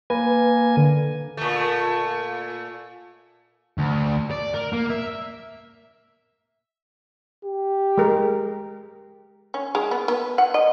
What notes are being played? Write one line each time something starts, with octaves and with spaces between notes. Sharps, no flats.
A#3 B4 G#5
D3
A#2 A3
D2
D5
A#4
A#3
E5
G4
G#3 A#4
C#4
G#3
B3
B3
F#5
D#5